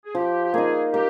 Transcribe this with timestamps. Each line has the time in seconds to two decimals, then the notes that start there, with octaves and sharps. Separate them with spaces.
0.05 G#4
0.15 F3 G4
0.44 G4
0.54 A#3 D#4 G#4
0.93 A#3 G4